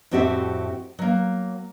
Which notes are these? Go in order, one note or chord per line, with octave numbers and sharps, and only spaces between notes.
F2 A2 C4 F#4 G4 E5
F#3 A#3